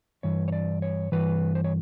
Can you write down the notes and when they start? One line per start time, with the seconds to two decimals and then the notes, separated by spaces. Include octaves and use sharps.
0.23 G2 E3 C#5
0.48 C#5
0.52 D5
0.82 C#5
1.12 G2 E3 B4
1.55 C5
1.64 C#5